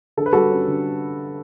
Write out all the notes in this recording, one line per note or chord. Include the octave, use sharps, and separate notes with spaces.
D3 A4
B4
G3 F#4 A4
C#4
D3